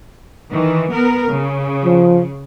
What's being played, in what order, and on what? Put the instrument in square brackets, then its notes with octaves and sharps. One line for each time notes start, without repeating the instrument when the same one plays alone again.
[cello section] D#3 E3
B3 A#4
C#3
[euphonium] F3